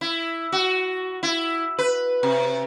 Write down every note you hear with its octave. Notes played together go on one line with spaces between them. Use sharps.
E4
F#4
E4
B4
C3